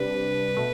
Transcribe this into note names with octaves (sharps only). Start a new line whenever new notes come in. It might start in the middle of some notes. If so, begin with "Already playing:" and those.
Already playing: C3 G3 D4 B4
B2 A3